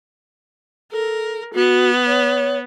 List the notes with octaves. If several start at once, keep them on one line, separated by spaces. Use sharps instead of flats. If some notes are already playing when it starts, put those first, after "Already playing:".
A4 A#4
B3 F#4
C#5